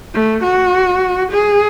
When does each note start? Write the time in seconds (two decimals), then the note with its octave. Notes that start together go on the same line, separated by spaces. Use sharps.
0.14 A3
0.43 F#4
1.32 G#4